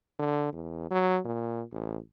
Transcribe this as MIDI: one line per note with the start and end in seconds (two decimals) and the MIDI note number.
0.19 0.49 50
0.52 0.88 40
0.90 1.20 54
1.25 1.62 46
1.72 1.97 33